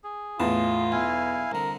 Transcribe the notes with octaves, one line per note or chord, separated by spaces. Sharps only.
G#4
E2 A2 F4 A5
B1 E4 F5 G#5
C2 D3 A#4